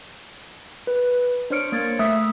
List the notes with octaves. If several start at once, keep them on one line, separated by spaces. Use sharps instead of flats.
B4
D4 C5 C#5 F6 C#7 D7
A#3 G#6 A6
A3 E5 D#6 E6 F#6 B6